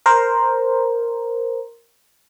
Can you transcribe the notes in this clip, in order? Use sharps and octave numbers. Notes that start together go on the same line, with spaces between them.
A#4 C5